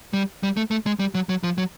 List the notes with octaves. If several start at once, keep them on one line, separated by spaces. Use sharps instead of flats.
G3
G3
A3
A3
G#3
G3
F#3
F#3
F3
F#3